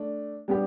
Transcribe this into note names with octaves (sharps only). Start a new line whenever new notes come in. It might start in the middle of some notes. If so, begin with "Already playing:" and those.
Already playing: A3 D4
G3 B3 D4 G4